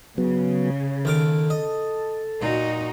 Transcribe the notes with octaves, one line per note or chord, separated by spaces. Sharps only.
C#3 F#3 B3
D#2 A4 A#4 D6
D#5
A#2 D#4 F#4